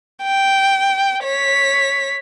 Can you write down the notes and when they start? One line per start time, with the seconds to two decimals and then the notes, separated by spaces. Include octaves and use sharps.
0.23 G5
1.24 C#5 B6